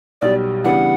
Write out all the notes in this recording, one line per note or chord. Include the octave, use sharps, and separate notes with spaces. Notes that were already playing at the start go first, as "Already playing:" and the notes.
B1 B2 G3 D5
C#3 E3 G3 B3 D4 F#5